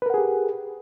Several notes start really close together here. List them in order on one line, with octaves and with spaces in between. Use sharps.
B4 A#4 F#5 G#4 G4